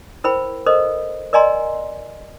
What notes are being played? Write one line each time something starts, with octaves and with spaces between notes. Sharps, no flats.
E4 A#4 C5 G5 B5
A4 A#4 C5 D#5
A#4 D5 D#5 G#5 A#5 C6